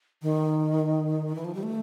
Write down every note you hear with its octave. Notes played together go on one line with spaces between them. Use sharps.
D#3
E3
F3
G3
A3